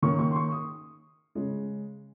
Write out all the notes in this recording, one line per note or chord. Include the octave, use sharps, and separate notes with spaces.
D#3 A#3 C#4 C#6
C#6
C6
C#6
D#6
C#3 G#3 C#4